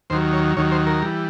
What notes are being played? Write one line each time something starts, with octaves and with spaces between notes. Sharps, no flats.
D#2 D#3 F#3 C5
C#5
D#2 D#3 F#3 C#5
C5
A#4
E3 G3